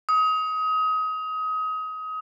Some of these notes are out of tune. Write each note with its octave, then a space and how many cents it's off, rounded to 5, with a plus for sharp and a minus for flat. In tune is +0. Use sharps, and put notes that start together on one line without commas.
D#6 +25